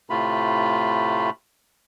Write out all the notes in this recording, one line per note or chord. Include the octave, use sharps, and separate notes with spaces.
A2 C3 A3 F4 B5